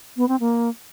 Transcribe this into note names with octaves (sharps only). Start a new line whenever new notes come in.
B3
C4
A#3